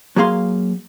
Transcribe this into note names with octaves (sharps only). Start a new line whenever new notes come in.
F#3 A#3 G#4 F5 C6